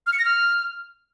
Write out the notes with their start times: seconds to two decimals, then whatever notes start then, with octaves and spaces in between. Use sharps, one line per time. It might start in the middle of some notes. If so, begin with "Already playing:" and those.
0.07 F6
0.13 C#7
0.19 A#6
0.25 F6